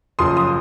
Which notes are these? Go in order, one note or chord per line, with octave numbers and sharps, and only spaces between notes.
F#1 F#2 F3 C6 D#6
D#6